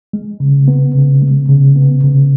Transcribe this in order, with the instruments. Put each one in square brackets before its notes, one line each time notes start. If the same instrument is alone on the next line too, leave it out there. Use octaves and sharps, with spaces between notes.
[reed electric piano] G#3
C#3
B3
C#3
G#3
C#3
B3
C#3